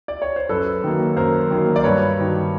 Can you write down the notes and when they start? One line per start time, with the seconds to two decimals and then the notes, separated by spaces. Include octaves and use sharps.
0.08 D5
0.22 C#5
0.36 C5
0.49 F#2 A4 B4
0.84 D#3 F#3 A#3
1.16 F#2 A#4 C5
1.51 D#3 F#3 A#3
1.76 D5
1.83 G2 B4 C#5
2.17 D#3 F#3